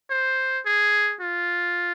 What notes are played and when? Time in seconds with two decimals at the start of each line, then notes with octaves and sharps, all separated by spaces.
0.10 C5
0.66 G#4
1.21 F4